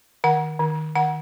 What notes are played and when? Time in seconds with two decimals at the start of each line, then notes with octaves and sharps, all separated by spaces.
0.24 D#3 F#5
0.60 D#3
0.95 D#3 F#5